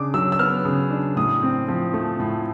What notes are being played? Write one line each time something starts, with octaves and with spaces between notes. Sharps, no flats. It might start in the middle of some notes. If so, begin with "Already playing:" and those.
Already playing: C#3 D4 D6
F#3 E6
E6
B3 F6
C#3
D4
A2 D#6
C4
F3
A3
A2